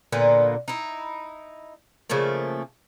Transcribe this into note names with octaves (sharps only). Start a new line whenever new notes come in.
A#2 D3 A#3 B3
D#4 E4
C#3 F3 A3 A#3